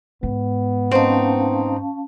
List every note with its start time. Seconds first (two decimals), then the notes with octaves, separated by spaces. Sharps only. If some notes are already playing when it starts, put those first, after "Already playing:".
0.23 G#2 B3
0.91 C4 C#4 D#4 F5 A5